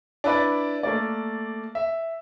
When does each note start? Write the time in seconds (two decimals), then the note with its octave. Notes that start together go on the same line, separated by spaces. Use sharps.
0.24 D4 E4 B4 D5
0.83 A3 A#3 D5
1.75 E5